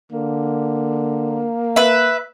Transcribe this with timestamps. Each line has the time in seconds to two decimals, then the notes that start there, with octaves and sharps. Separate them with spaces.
0.12 D3 A#3
1.76 B4 E5